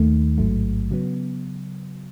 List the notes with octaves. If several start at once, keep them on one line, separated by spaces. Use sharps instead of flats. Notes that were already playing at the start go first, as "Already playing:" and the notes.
Already playing: D#2 D#3 A3
A1 G#2 F#3 A3
C#3 F#3 B3